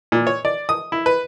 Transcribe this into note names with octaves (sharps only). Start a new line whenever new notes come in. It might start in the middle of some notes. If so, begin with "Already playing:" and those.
A#2
C#5
D5
D#6
E4
B4